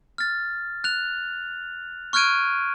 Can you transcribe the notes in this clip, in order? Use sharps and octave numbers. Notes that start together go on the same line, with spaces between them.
F6 A6
F#6 F7
C#6 F6 F#6 G#6 D7 D#7